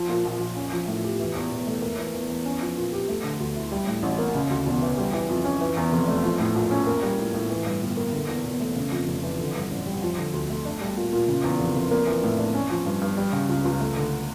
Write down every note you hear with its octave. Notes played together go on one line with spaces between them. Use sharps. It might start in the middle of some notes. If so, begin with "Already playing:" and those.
Already playing: F3
A#2
A#1
A#1
C#4
F3
A2
G4
E3
E2
E1
A3
A#3
E3
E2
E2
C#4
F3
A#2
G4
A3
D3
D2
E4
G3
A2
A1
A#3
C#3
D2
E1
E3
G3
E3
F2
C#4
E3
E2
F1
A3
F3
A2
A#1
C#4
A#3
G3
A2
A2
E3
G2
G1
A#3
D3
E2
E1
A3
C#3
F2
F1
E3
D3
G2
A1
G3
F3
D3
D2
A3
D4
G3
A#2
A#2
C#3
E2
F1
F1
A#3
E3
A2
D4
C#4
F3
G2
G2
G3
C#3
C#2
C#2
A3
D3